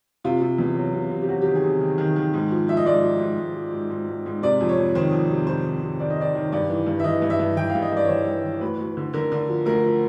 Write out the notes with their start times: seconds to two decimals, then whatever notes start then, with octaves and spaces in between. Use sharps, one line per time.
0.24 C3 F4
0.41 C3
0.58 E2
0.76 F#3
0.95 C3
1.11 C3
1.22 G4
1.28 F#3 F#4
1.42 G4
1.46 D#3
1.55 G#4
1.64 C3
1.81 D#3
1.98 D#3
2.16 D#3
2.34 G#2
2.51 F3
2.68 F3 E5
2.77 D#5
2.85 G#2 D5
3.04 F3
3.20 G#2
3.38 G#2
3.55 F3
3.73 G#2
3.90 G#2
4.07 G#2
4.26 G#2
4.42 C3 D5
4.61 F2
4.69 C#5
4.78 F2
4.95 D#3 C5
5.12 F2
5.30 C3
5.47 F2 C5
5.65 D#3
5.83 C3
6.00 D#3 D5
6.10 D#5
6.17 D#3 D5
6.35 D#3
6.52 G2 D5
6.70 E3
6.86 G2
7.00 E5
7.04 E3 D#5
7.22 G2
7.30 E5
7.39 G2
7.56 E3 G5
7.70 F5
7.75 G2
7.82 D#5
7.92 G2 D5
8.05 C#5
8.09 E3 C5
8.27 G2
8.45 E3
8.61 D2 B4
8.79 D2
8.97 D3
9.14 D3 A#4
9.32 D3
9.49 F3
9.65 D2 A#4
9.84 F3